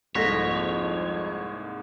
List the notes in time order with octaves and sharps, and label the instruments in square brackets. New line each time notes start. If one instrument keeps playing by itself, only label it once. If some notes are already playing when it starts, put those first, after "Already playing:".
[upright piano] C2 G#2 A#3 [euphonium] F2 [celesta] A4 A#6 B6 [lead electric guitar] C#5